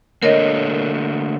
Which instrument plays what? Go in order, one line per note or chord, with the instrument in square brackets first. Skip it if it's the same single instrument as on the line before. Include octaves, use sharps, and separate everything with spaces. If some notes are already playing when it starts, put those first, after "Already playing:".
[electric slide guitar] D3 A3 A#3 [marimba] A#4 C#5 D#5